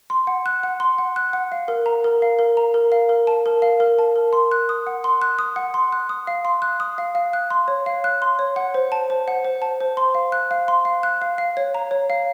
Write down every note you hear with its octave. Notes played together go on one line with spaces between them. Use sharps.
C6
F#5
F#6
F#5
C6
F#5
F#6
F#5
F5
A#4
A#5
A#4
F5
A#4
A#5
A#4
F5
A#4
A5
A#4
F5
A#4
A5
A#4
C6
F#6
D#6
F#5
C6
F#6
D#6
F#5
C6
F#6
D#6
F5
C6
F#6
D#6
F5
F5
F#6
C6
C#5
F5
F#6
C6
C#5
F#5
C5
A5
C5
F#5
C5
A5
C5
C6
F5
F#6
F5
C6
F5
F#6
F5
F5
C#5
A#5
C#5
F5